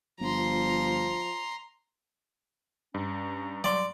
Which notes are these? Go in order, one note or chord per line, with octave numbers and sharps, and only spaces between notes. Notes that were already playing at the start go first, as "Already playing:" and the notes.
G1 F3 A#5 C6
G2 C#4 A#5
F#3 D5 C6